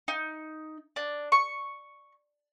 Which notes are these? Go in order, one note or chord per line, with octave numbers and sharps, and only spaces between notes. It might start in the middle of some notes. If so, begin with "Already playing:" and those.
D#4
D4
C#6